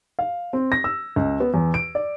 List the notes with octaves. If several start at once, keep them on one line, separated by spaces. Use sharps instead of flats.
F5
C4
A#6
E6
C#2
B3
E2
D7
D5